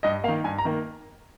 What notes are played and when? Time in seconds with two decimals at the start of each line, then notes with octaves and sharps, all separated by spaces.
0.03 G2 D#5
0.24 A#3 F5
0.28 D#3
0.44 G2 G#5
0.58 A#5
0.65 D#3 A#3